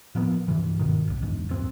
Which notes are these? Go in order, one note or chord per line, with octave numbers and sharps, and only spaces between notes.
A2 F3 A#3 B3
G2 C3 E3
G1 G#2 B2 D#3
F#1 C2
F#1 E2 G#2
D1 F#2 C4